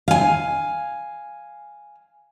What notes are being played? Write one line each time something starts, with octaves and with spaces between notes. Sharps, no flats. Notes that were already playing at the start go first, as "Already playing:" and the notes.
F5 G#5